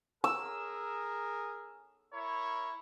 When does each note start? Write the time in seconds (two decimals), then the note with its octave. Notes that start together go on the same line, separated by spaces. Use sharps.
0.24 G#4 A#4 E6
2.14 E4 A#4 C#5